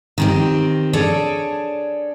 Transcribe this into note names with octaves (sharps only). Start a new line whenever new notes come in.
D#3 C4 G4
D4 G#4 A4 C#5 D5